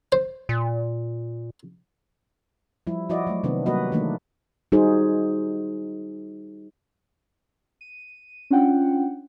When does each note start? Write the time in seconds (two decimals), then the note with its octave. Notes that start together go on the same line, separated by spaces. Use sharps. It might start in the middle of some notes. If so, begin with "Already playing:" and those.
0.12 C5
0.49 A#2
2.87 F3 G3 E4
3.09 F3 E4 F#4 D5 D#5
3.27 F#3 A3
3.44 C3 D#3 B3 C4 D4
3.66 F#3 G3 A#3 F#4 B4 D#5
3.92 D#3 E3 A3 A#3 D4
4.72 G3 D#4 F#4 G#4 C5
7.81 D#7
8.50 C#4 D4 F4 F#5 G5